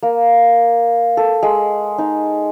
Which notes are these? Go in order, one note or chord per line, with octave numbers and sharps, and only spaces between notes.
A#3
A4
G#3
D#4